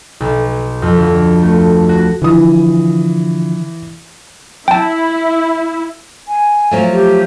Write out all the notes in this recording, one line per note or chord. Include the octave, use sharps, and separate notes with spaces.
B1
F2
D2
A3
F#4
D3 E3 F3 D#6
E4 G5 A5
G#5
F3 F#3 A3
G4